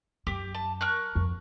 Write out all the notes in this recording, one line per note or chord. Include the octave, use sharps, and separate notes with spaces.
F#2 G4 D6
A5
A#4 C#6 F#6
F2